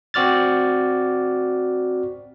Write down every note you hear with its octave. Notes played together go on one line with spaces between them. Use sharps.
C4 F#4 D5 F6 A6